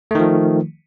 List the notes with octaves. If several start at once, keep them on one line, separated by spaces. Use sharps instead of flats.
D#3 F3 A3